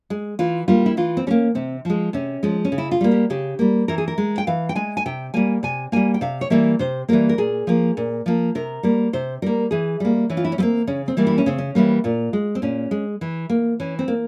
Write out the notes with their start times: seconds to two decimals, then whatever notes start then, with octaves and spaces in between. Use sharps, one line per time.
0.10 G#3
0.39 E3 F4
0.68 G3 A#3 F4
0.86 E4
0.97 E3 F4
1.17 C4
1.27 G3 A#3 C#4
1.55 C3 C4
1.85 F3 G#3
2.13 C3 C#4
2.43 F3 G#3
2.65 C#4
2.72 C#3
2.78 E4
2.91 F4
3.01 G3 A#3
3.11 G4
3.30 C#3 G4
3.59 G3 A#3
3.88 E3 A#4
3.98 G#4
4.08 A#4
4.18 G#3
4.38 G5
4.47 E3 F5
4.69 G5
4.75 G#3 G#5
4.97 G#5
5.06 C3 G5
5.34 G3 A#3 G#5
5.63 C3 G#5
5.92 G3 A#3 G#5
6.14 G5
6.21 C3 F5
6.41 C#5
6.50 E3 G3 A#3 E5
6.79 C3 C5
7.08 E3 G3 A#3 A#4
7.29 A#4
7.38 A#2 G#4
7.67 F3 A#3
7.97 A#2
8.26 F3 A#3
8.55 C3 A#4
8.83 G3 A#3
9.13 C3 C5
9.42 G3 A#3 A#4
9.71 E3 G#4
10.00 G3 A#3
10.30 E3 C#4
10.37 F4
10.45 E4
10.52 C#4
10.58 G3 A#3 C4
10.87 C#3 C#4
11.08 C4
11.17 E3 G3 A#3
11.27 E4
11.38 C#4
11.46 C#3 C4
11.58 C#4
11.75 E3 G3 A#3
12.04 A#2 F4
12.33 G#3
12.55 C4
12.62 A#2 C#4
12.91 G#3
13.21 E3
13.50 A#3
13.80 E3 C#4
13.99 C4
14.08 A#3